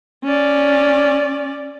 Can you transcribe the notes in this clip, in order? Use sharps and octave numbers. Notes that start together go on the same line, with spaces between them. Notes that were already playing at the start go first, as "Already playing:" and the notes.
C#4 D5